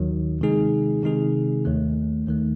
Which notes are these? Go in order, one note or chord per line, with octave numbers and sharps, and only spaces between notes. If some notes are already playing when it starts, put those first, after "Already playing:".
Already playing: D#2 D#3 F#3
C3 D#3 G#3 D#4 G#4
C3 D#3 G#3 D#4 G#4
D#2 D#3 A3
D#2 D#3 A3